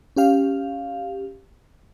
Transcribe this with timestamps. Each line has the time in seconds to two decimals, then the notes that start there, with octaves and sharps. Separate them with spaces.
0.16 C#4 G4 F5